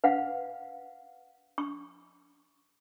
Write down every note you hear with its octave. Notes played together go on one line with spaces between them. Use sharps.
B4 F5 F#5
C#6